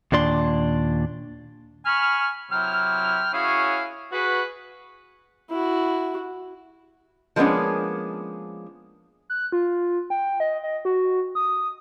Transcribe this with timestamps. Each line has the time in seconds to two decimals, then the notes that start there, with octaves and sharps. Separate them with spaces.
0.12 D#2 A#2 D4 C6
1.86 G#5 B5 C#6 F6
2.51 C3 F#3 E4 G5 F6
3.33 C#4 E4 F#4 G#4 C#5 F5
4.12 F#4 G#4 B4
5.50 E4 F#4
7.36 F3 G#3 A#3 B3 C#4 D4
9.30 F#6
9.52 F4
10.10 G5
10.40 D#5
10.63 D#5
10.85 F#4
11.35 D#6